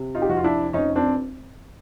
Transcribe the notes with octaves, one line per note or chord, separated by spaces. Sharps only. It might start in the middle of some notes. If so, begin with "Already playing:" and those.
Already playing: C3
D#4 F4
G4
F2 F#4
F4
D4 E4
F1 C#4 D#4
C4 D4